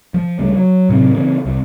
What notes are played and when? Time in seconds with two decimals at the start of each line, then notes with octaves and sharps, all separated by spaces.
0.14 F3
0.39 C#2 C#3 G3 A3
0.57 F#3
0.89 A2 C3 F#3 C4
1.12 C#3 E3 G3 C4
1.46 C2